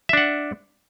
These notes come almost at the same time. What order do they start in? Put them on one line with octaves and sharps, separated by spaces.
E5 D4 F#5